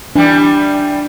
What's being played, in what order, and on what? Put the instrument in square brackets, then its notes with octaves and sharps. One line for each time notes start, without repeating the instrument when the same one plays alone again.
[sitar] E3 G3 [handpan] D4